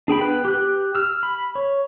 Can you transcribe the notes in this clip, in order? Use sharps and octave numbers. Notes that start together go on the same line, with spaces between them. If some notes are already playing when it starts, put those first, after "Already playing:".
D4 G#4 G5 B5
B3 B4 G5
G4 F#6
E6 F6
B5
C#5